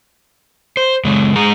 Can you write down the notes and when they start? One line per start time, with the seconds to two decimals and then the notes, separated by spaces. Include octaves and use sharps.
0.77 C5
1.05 F#2 C#3 G#3
1.36 G#3 G#4 A#5